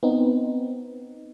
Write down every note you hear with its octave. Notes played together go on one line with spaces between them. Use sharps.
B3 C4 D#4